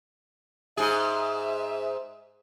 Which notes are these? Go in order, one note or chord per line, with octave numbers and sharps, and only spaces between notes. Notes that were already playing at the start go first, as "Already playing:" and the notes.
G#2 G#4 E5